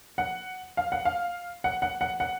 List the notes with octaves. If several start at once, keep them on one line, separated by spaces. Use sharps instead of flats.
F#5
F5
F#5
F5
F#5
F#5
F#5
F#5